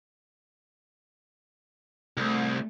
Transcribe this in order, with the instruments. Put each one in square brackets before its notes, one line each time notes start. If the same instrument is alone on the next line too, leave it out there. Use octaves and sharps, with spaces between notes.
[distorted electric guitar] C2 [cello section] A3